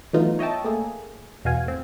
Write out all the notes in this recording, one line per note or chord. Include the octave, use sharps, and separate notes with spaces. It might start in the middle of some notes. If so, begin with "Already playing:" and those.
E3 F#3 A3 B3 D#4 F4
C#5 D#5 E5 G5 A5
A3 A#3 G#4
E2 B2 F#4 F5 G#5
A2 C4